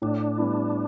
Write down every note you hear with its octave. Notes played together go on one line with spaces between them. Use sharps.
A2 D4
G3 B3 E4